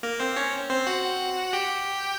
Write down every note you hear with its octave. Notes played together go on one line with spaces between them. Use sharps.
A#3 A#4
C4 C5
C#4 C#5
C4 C5
F#4 F#5
G4 G5